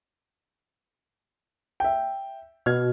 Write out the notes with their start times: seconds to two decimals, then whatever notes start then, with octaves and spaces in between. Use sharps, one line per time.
1.80 E5 G5
2.66 B2 F6 G#6